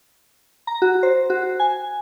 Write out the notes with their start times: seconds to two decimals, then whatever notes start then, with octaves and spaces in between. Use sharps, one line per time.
0.67 A#5
0.82 F#4
1.03 C5
1.30 F#4
1.60 G#5